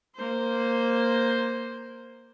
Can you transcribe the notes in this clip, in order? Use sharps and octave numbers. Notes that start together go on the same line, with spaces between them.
A#3 C5